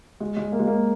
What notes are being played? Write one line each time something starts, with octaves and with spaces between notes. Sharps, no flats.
G#3
G#3
A#3
G#3
A#3